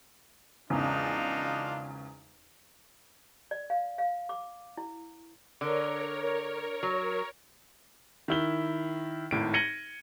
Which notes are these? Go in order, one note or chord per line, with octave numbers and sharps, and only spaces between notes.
G#1 E2 C#3 D4 D#4 F4
D5
F5
F5
D6
E4
D3 A#4 C#5
F#3
D#3 E4 G7
G#1 A2 D7
G#6 A#6 C#7 D#7 F#7 G7